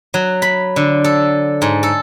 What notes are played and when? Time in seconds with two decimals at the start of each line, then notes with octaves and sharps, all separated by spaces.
0.14 F#3
0.42 B5
0.76 D3
1.04 A4
1.62 G#2
1.83 A4